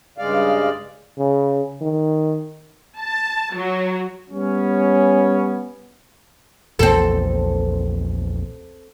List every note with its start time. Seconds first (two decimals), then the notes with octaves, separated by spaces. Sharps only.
0.18 G2 C#3 G#3 D5 F5
1.18 C#3
1.81 D#3
2.99 A5
3.55 F#3
4.30 G3 B3 C#4
6.79 A#1 E2 C4 A4